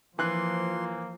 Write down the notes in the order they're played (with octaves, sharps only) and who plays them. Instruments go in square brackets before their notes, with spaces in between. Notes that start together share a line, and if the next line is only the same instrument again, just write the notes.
[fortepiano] E3 F#6 [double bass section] F3 [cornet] A#3 [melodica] C6